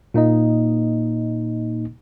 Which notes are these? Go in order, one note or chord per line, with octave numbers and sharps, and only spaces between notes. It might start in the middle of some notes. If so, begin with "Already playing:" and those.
A#2 A#3 D#4 D#5